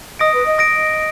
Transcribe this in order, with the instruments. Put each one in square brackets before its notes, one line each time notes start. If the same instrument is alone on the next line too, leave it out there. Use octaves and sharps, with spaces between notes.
[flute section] D#5 [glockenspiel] D#6 A#6 D7
[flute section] B4
D#5
[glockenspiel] D#6 A#6 D7